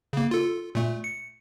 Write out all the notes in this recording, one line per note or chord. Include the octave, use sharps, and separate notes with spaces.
C#3 A#3
F4 A4
A#2 A3
C#7